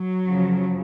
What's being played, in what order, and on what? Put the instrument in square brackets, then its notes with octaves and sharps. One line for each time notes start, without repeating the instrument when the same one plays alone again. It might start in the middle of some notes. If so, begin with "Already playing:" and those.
Already playing: [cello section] F#3
F#2 C#3 F3